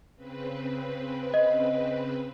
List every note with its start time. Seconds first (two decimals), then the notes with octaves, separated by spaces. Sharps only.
0.16 C#3 C4 B4
1.34 D#5